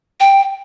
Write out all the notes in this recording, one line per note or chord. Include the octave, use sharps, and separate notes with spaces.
G5